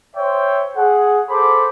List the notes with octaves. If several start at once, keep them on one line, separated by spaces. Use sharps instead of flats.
C5 C#5 E5 G5
G#4 F#5
A4 C5 B5 D6